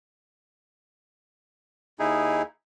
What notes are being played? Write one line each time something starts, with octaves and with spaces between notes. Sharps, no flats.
D#2 D#4 E4 G#4